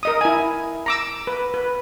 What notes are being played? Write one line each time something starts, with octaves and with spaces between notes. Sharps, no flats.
A#4 D#5 D#6
E4 G#5
A#5 D6 E6
B4
B4